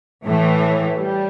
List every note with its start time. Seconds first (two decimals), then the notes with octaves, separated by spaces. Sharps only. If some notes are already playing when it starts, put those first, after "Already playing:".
0.26 A2 E3 A3
0.99 G3